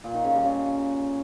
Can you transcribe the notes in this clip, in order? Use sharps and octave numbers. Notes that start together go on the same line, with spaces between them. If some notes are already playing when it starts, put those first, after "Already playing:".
A#2
D#3
C#3
G3
C#3